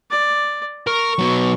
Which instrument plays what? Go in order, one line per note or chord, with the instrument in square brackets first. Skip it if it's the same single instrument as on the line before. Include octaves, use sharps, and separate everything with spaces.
[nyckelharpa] D5
[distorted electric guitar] A#4 [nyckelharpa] C#6
[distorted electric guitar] B2 F#3